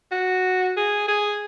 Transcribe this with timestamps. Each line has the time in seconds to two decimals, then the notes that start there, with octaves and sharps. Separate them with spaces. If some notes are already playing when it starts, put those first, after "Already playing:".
0.11 F#4
0.76 G#4
1.08 G#4